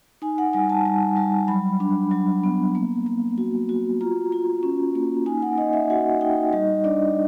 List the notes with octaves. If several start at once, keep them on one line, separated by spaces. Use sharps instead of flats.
D#4 G#5
F#5
G3 G#5
A5
G3
G3
F#3 B5
D4
F#3
B3
A#3
A#3
F#4
F#4
F4 A#5
F4
C#4
A#3
D#4 G#5
F#5
D#4 D#5
E5
F#4 F#5
D#4 G5
G3 D#5
D4 D5